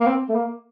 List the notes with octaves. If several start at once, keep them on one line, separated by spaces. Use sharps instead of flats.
A#3
C4
A3
A#3